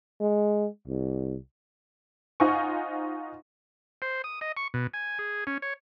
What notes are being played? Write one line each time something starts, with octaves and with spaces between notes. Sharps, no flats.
G#3
C2
D#4 F4 C5 F#5 G#5 C#6
C5
D#6
D#5
C#6
B2
G#5
G#4
C#4
C#5